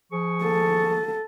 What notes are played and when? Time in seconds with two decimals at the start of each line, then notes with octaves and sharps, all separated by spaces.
0.12 F3 G#4 C#6
0.44 A4